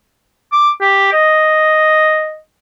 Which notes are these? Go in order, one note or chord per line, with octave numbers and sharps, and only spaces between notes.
D6
G4
D#5